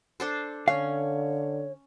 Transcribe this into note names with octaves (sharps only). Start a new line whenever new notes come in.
D4 A4 C5
D3 C#4 C#5 F5